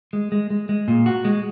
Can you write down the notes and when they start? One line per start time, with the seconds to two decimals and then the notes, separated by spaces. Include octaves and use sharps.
0.13 G#3
0.32 G#3
0.50 G#3
0.69 G#3
0.88 A#2
1.06 F#4
1.25 G#3